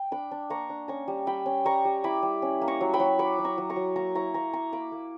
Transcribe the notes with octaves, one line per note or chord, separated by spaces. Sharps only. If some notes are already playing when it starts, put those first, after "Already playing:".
Already playing: G5
D4 B5 D6
D4
A#3 A#5 C#6
D4
C#4 A#5 C#6
G3
G3 G5 B5
C#4
G3 A#5 C#6
G3
E4 B5 D6
G3
C#4
A#3
A#5 C#6
F#3
G5 B5
F#3
F#3 B5 D6
F#3
A#5 C#6
F#3
A#5 C#6
F#3
A#3 A#5 C#6
E4 A#5 C#6
A#3 A#5 C#6
A#3 A#5 C#6
A#3 B5 D6
A#3